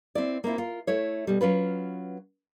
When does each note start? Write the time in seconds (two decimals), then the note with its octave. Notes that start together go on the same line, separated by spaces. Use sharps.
0.15 C4 E4 D5
0.44 A#3 C4 E4 F4
0.58 F4 A#4
0.87 A3 E4 C#5
1.27 B2 G3
1.41 F#3 C#4 F4 B4